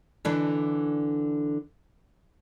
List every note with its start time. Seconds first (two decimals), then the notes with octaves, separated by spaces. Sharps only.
0.25 D3 E3 D4